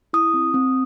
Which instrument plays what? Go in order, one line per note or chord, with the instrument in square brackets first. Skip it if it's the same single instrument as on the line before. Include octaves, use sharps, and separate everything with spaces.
[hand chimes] E4 D#6
C4
C4